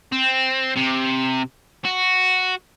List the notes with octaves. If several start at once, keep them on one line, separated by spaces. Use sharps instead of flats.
C4
C3
F#4